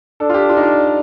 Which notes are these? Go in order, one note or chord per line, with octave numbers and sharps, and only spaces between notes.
D4 A4
F4
G4
F4
D#4
F4